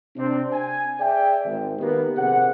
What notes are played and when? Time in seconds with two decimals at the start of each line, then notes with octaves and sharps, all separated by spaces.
0.16 C3 C4 D4
0.52 G#5
1.00 G#4 D5 E5 G5
1.45 G#1
1.79 D#3 A#3 B3 G4
2.17 A#1 C3 A#3 G#4 F#5